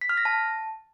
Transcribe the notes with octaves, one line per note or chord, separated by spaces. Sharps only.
B6
F6
A#6
A5